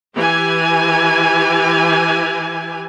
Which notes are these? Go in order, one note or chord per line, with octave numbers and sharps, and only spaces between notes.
E3 G4 G#5